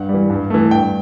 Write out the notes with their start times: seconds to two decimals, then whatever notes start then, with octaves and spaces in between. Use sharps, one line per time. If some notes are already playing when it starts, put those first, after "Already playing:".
Already playing: G2 F#5
0.09 E3 G3
0.30 G2
0.50 E3 A3
0.71 G2 G5